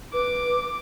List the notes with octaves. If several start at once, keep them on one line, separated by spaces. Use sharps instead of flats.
B4 D6